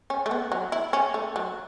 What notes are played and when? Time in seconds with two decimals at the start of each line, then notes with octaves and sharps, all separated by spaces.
0.10 C#4
0.26 A3
0.31 B3
0.52 F#3
0.72 E4
0.93 C#4
1.14 A3
1.36 F#3